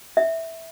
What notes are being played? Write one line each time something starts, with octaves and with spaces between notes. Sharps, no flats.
E5